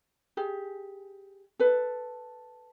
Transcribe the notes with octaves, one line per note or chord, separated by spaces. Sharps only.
G4 G#4
A4 B4